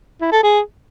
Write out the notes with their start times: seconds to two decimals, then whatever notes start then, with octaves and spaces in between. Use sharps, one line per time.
0.21 E4
0.32 A4
0.43 G#4